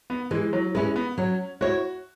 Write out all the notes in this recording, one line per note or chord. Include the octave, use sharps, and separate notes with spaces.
B3
E3 G#3
F#3
G#3 C#4 E4 B4
B3
F#3 C#4
E4 F#4 C#5